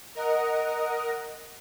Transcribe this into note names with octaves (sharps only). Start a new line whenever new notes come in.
A#4 D#5 F#5